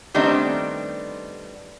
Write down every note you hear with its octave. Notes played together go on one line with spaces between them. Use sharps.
D#3 G3 A3 B3 C4 D4